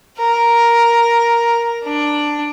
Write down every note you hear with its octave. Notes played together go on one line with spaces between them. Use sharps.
A#4
D4